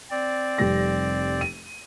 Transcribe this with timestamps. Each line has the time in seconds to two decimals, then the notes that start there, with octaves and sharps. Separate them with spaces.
0.10 C4 D5
0.58 F1 G3 A#6
1.41 D#7